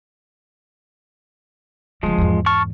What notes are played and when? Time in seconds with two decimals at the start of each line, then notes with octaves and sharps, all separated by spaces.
2.03 G1 F3 G3 G#3
2.18 E2 G#2
2.46 A5 C#6 F6